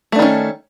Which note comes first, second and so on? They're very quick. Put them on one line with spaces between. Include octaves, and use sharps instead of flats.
A3 D4 D#3 C#4